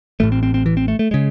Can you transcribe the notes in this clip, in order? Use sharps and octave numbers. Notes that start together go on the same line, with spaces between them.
A1 A2 A3
C4
C4
C4
E3
C4
A3
A3
C#3 G#3